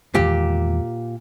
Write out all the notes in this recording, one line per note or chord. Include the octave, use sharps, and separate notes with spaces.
E2 A#2 D#3 G#3 G4